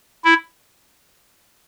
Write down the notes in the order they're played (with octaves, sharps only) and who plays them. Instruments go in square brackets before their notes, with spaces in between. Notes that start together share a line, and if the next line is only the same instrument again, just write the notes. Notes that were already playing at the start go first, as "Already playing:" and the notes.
[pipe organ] E4